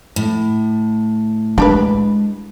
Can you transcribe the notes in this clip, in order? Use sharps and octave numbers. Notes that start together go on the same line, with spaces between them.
A2
G#3 D4 G4 B4